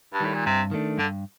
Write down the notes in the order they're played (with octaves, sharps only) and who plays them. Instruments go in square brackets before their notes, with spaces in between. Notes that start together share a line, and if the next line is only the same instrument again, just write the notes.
[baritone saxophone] G2
[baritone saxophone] A2 [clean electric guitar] D#3 G3
[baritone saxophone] A#2
[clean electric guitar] G2 [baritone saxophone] C3
[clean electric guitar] D#3 A3 D4
[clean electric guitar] G2 [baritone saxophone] D3